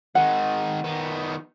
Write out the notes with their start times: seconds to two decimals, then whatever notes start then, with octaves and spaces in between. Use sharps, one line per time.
0.15 D#3 G#3 F#5
0.84 D#3 B3